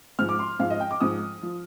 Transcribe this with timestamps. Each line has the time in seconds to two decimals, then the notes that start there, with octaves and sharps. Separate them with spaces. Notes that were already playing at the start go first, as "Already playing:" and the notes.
0.19 G#2 F3 F6
0.29 D6
0.39 C6
0.60 G#2 F3 F5
0.70 D#5
0.80 G5
0.91 D6
1.00 G#2 F3 D#6
1.43 F3